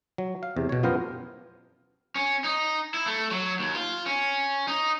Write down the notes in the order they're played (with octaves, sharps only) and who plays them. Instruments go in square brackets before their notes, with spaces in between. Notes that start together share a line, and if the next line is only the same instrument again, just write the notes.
[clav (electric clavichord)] F#3
F5
E2 C3
B2 C#5
F#2 F3 B3 G4 A#4 C5
[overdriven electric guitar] C#4
D#4
E4
A3
F#3
D#2
F4
C#4
D#4